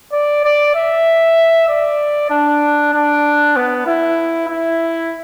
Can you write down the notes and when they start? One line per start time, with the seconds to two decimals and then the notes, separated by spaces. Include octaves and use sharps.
0.12 D5
0.45 D5
0.76 E5
1.69 D5
2.31 D4
2.93 D4
3.56 B3
3.87 E4
4.49 E4